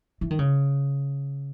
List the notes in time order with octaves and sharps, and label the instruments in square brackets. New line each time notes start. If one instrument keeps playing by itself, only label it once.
[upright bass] E3
D#3
C#3